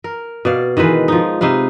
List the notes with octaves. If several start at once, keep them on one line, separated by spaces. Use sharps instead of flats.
A#4
B2 D5 F5
D#3 E3 G#3 B4
F3 D#4
C3 D#4 B4 F5